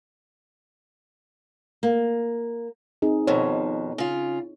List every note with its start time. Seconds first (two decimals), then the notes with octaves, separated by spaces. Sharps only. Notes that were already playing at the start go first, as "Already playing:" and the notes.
1.83 A#3
3.02 C4 D#4 G#4
3.27 F2 B2 D#3 C#5
3.98 C#3 F4